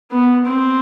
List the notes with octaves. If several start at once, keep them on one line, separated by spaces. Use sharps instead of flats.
B3
C4